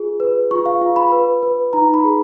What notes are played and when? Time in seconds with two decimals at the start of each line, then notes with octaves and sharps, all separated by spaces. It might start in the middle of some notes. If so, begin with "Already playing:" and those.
Already playing: F4 G#4
0.20 B4
0.51 F4 C#6
0.66 F5
0.81 F4
0.96 B5
1.12 B4
1.43 B4
1.73 D#4 A#5
1.94 B5
2.04 G#4